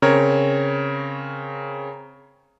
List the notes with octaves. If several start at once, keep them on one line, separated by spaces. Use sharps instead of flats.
C#3 C4 A#4 C#5